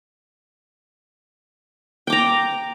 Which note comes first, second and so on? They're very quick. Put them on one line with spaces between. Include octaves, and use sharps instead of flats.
G5 D6 A#5